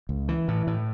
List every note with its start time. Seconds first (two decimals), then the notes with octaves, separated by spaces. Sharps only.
0.09 C#2
0.29 E3
0.48 A2
0.67 A2